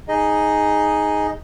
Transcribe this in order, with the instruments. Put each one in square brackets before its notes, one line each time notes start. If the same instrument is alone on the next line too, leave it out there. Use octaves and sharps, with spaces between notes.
[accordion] D#4 G#4 D#5